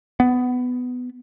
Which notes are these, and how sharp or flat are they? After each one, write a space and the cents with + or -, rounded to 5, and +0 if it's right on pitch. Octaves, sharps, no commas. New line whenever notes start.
B3 +15